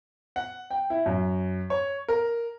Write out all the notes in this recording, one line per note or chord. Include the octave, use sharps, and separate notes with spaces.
F#5
G5
E4
F#2
C#5
A#4